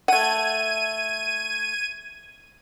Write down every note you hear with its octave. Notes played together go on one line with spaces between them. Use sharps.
A3 F#5 G#6 D#7